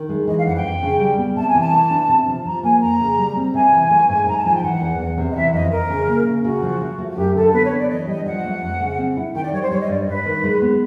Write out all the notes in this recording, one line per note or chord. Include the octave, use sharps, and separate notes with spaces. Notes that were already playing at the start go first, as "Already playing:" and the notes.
Already playing: D#3
G#3
E3 D#5
F5
F2 F#5
G5
F2
C#3
G3
B3
C3 A5
G#5
E3
A5
A3
D4
C3
F3
F3 A#5
A#3 G#5
F2 A#5
C#3
G3
C4
C3 G#5
E3
A3
G#2
G#2 A#5
A5
F3 G#5
G5
E3 F#5
E2
E2
C3
D#5
E3 E5
F2 D#5
F2 A#4
C#3
A#3
C#3
C#3 F#4
F3
F3
A3
F#4
F#2 G4
D3 A4
B3 B4
C#5
D4
D5
E3 D#5
G3 D#5
F3 F#5
A3
F2
C#3
C4
E4
D#3 G5
D5
G3 C#5
C5
G3 C#5
D#5
G2 D5
G2 B4
D#3
G#3
B3